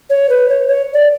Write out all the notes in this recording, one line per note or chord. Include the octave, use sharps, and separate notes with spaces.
C#5
B4
C#5
C#5
D5